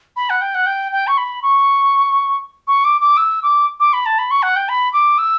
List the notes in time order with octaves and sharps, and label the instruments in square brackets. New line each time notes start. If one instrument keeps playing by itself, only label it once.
[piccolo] B5
F#5
G5
F#5
G5
G5
C#6
B5
C#6
C#6
D6
D6
E6
D6
D6
B5
A5
B5
C#6
F#5
G5
B5
D6
E6